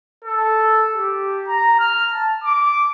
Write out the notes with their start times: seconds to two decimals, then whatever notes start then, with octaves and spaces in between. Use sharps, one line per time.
0.24 A4
0.96 G4
1.48 A#5
1.80 F6
2.14 A5
2.44 D6